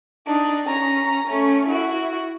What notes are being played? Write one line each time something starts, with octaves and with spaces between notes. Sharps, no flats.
D4 D#4
C#4 A#5
A3 C#4
E4 F#4